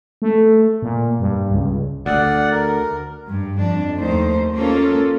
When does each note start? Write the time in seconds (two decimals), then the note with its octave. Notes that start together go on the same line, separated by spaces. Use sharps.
0.22 A3
0.82 A#2
1.20 G2
1.51 C#2
2.06 D2 D5 F#5
2.52 A#4
3.28 G2
3.59 F2 D4
3.98 D#2 A3 D#4 C5
4.56 A#3 C#4 F4 A4